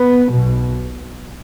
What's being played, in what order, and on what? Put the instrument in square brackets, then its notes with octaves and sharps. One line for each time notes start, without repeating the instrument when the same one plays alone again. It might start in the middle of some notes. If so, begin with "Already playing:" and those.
Already playing: [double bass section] B3
B1 B2